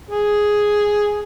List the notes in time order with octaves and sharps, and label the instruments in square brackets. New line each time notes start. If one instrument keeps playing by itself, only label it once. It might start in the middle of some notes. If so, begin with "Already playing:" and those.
[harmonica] G#4